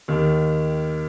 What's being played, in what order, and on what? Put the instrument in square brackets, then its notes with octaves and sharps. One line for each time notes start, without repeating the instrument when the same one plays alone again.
[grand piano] D#2 D#3